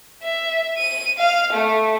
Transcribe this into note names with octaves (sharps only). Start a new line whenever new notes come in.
E5
D#7
F5
A3